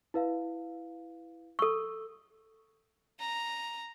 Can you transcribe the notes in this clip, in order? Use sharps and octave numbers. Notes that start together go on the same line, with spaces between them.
E4 B4 F5
A4 C#6 E6
A#5